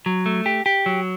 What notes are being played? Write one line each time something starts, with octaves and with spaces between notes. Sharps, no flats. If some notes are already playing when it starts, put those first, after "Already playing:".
F#3
A3
G4
G4
F#3